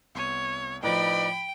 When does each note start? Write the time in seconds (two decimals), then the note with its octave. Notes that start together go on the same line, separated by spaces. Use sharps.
0.15 C2 B3 C#5 D#7
0.83 A2 F3 D#4 B4 D5 G5 B5